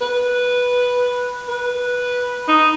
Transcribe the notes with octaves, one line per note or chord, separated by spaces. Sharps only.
B4
B4
D#4